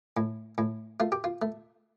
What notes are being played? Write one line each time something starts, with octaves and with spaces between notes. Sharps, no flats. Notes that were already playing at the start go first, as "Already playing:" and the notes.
A2
A2
A3 F4
G4
F4
A3